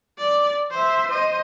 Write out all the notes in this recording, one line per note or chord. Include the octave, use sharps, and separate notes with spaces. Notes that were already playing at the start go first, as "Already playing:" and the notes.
D5
C5 E5
C5 D#5